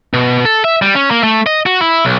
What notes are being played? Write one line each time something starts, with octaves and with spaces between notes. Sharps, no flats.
B2
A4
E5
G3
C#4
A#3
A3
D#5
F#4
E4
B1